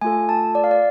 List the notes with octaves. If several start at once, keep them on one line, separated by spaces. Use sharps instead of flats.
A3 F4 A4 G#5
A5
D5
F5
D5